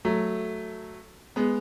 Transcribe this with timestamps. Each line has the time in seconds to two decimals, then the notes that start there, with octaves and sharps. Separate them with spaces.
0.05 F#3 A3
1.36 G#3 B3